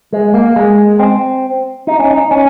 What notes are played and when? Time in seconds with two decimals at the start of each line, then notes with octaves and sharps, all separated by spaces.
0.13 G#3
0.34 A#3
0.56 G#3
0.99 C4
1.87 D#4
1.99 C#4
2.10 D#4
2.31 C#4